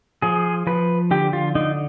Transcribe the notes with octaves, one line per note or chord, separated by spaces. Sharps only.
F3 G#4
F3 B4
D3 G4
F4
D3 D#4